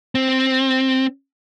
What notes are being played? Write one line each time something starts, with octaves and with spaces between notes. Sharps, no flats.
C4